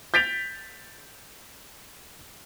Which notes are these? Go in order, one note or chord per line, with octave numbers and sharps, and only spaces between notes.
G6 A6 B6 D7 F7